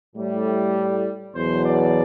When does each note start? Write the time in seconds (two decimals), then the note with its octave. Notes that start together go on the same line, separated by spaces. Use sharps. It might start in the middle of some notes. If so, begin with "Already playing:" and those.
0.15 A2 G3
1.35 E2 B2 F#3 C5
1.65 D5